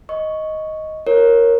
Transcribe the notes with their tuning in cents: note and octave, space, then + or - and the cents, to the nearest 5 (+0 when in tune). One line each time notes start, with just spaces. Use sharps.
D#5 +5 C#6 +0
F4 +0 A#4 +0 C#5 -15